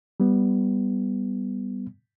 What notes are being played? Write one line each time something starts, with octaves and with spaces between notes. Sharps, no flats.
G3 B3